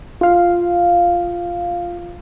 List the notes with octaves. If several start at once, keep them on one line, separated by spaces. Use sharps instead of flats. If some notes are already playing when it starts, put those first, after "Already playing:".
F4 F5